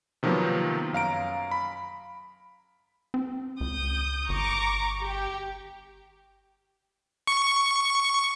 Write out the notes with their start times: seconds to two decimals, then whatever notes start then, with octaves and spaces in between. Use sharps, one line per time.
0.23 C3 D#3 F3 F#3 A#3 B3
0.93 F#2 F5 A#5 D7
1.51 B5
3.14 C4
3.61 C#2 D#6 G6
4.29 G1 A#5 C#6 D6
5.01 G4
7.27 C#6